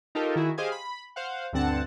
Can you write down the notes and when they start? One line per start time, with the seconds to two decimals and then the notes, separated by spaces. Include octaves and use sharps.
0.15 D#4 F4 G4 A4 A#4
0.36 D#3 E4 F#4 G#4
0.58 G4 G#4 C5 D#5 F5 G#5
0.72 B5
1.16 C5 F5 F#5
1.53 D2 G2 D3 C4 F#5 A5